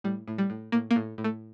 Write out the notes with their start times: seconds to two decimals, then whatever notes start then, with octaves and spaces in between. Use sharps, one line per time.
0.04 A2 G3
0.28 A2
0.38 G3
0.50 A2
0.72 A2 A#3
0.91 A#3
0.96 A2
1.18 A2
1.24 A3